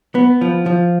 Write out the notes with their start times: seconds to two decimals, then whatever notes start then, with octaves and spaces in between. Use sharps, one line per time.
0.15 B3
0.41 F3
0.66 F3